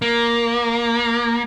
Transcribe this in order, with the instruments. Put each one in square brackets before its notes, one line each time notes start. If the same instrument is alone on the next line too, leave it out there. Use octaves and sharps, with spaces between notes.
[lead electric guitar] A#3